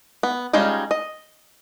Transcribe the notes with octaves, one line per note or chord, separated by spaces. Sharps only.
B3
G3 G#3 C#4 D#4 F4
D#5